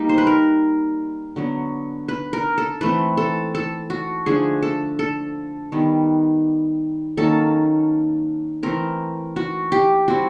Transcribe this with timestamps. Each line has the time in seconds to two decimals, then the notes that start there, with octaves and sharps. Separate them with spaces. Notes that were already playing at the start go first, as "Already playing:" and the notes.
Already playing: G3 A#3 D#4
0.09 C5
0.18 B4
0.27 A#4
1.36 D3 F#3 B3
2.08 B4
2.33 A#4
2.58 A4
2.81 E3 A3 C4 B4
3.17 A4
3.55 A4
3.90 F#4
4.26 D3 F3 A3 D4 G#4
4.62 A4
4.99 A4
5.72 D#3 G3 B3
7.17 D#3 F#3 A#3 C#4 A4
8.63 E3 A3 C4 A#4
9.36 F#4
9.72 G4
10.08 G3 C4 E4 F#4